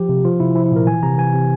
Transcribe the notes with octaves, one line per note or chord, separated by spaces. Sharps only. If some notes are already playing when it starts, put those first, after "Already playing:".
Already playing: F3 G4
C3
F3 F4
C3 E4
F3 E4
E4
A#2 A#4
E3 G#5
C3 A#5
E3 G#5
C3